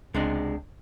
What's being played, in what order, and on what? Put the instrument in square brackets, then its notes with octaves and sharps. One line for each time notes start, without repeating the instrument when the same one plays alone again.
[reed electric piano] C#2 [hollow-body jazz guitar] C3 G#3 D4